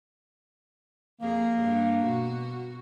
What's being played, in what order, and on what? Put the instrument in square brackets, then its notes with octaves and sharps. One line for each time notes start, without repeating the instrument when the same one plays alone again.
[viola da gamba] F2 G#4 [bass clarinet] A#3
[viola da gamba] G2 D4
B2 F#4